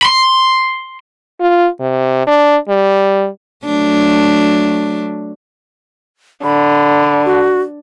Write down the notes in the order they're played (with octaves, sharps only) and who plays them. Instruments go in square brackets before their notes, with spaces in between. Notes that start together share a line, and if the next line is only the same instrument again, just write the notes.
[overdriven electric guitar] B5 C6
[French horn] F4
C3
D4
G3
[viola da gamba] F#3 A3 D4
[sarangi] D3 [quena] B5
[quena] F#4